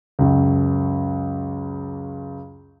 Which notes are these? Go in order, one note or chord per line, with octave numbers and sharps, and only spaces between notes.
C#2 F#2